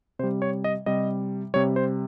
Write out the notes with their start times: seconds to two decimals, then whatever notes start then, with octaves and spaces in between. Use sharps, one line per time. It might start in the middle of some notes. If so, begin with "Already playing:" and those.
0.19 C3 C5
0.23 G3
0.42 C#5
0.64 D#5
0.86 C3 G3 D#5
1.54 C3 G3 C#5
1.76 C5